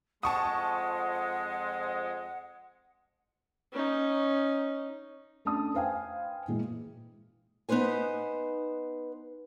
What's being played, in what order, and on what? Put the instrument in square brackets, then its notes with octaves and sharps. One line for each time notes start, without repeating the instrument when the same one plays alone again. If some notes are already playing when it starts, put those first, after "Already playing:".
[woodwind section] F2 G#3 [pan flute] F#5 [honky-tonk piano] A5 C#6 D#6
[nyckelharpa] C#4 D#4
[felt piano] A3 C#4 D4 A5 D#6
B4 C5 F5 G5 G#5
A#2 E3 G#3
[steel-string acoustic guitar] B3 D#4 B4 C5 G#5